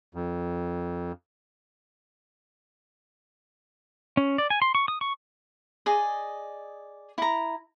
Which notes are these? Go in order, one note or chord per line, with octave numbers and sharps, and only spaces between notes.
F2
C#4
D5
G#5
C6
C#6
D#6
C#6
G#4 D5 D#5
E4 A#5